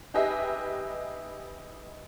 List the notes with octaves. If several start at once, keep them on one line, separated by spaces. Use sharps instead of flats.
D#4 G4 G#4 B4 D#5 E5